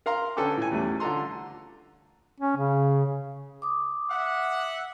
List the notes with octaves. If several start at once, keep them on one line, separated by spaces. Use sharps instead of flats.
A#4 F5 A#5 C6
D3 C#4 A4 B4 G5 D6
A2 G#5
E2 G3 A3 C#4
D3 F4 A4 A#5 C6
C#4
C#3
D6 D#6
E5 F#5